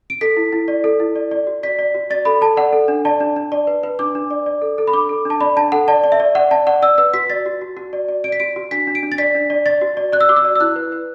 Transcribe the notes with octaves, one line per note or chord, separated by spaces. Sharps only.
D7
A4 B6
E4
E4
D5
A4
E4
D5
D5
F#4
D5 B6
D5
F#4
D5 A6
A4 B5
A4 A5
D5 F#5
A4
D4
D5 A5
D4
D4
D5
B4
B4
D4 D6
D4
D5
D5
A4
A4
B5
D4 D6
A4
D4 A5
D5 B5
D4 A5
A4 F#5
D5 A5
D5
E5
D5
D5 F#5
D5 A5
D5 F#5
D5 E6
B4 E6
F#4 B6
D5 A6
F#4
F#4
F#4
D5
D5
D5 D7
B6
F#4 D7
F#4
D4 B6
D4
D7
D4
A6
D5 B6
D4
D5
D5 A6
F#4
D5
D5 F#6
E6
F#4 D6
E6
D5
E6
E4 F#6
B4
B4